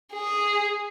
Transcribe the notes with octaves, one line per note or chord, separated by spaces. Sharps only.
G#4